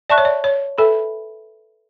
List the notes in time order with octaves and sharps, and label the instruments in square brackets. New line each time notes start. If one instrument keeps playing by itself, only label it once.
[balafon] D5 [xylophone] E5 A5 C#6 F#6
[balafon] C#5
D5
C#5
[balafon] A4 [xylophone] B4 E5 G#5 B5